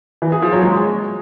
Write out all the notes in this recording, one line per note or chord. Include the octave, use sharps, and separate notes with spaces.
E3
G#4
F3
F#3
G#3